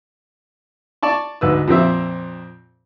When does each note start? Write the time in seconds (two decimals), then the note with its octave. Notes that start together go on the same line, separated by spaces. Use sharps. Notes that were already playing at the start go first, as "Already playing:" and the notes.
1.03 D5 A5 C#6
1.41 D2 G#2 B4 E6
1.68 F2 A#2 C4 E5